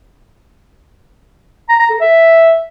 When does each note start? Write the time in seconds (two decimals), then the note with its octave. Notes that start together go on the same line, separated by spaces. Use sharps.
1.69 A#5
1.79 A#5
1.90 A4
2.00 E5